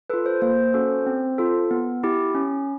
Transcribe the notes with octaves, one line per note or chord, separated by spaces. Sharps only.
F4 A4 B4
C5
A#3 C5
C#4 F#4 A4
C4
F4 A4
B3
E4 G4
C#4